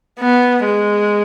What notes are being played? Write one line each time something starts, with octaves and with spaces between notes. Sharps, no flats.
B3
G#3